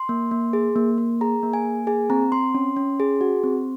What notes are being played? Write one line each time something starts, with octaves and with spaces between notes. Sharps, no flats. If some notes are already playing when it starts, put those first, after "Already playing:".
Already playing: C6
A#3
A#3
G#4
A#3
A#3
G#4 A#5
A#3
G#5
A#3
G#4 G#5
C4 A#5
C4 C6
C#4
C#4
G#4
F#4
C4